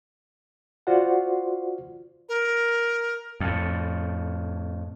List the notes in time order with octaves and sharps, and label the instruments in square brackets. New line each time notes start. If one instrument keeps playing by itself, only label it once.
[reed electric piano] F4 F#4 C5 D5 F#5
[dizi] A#4
[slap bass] F2 A2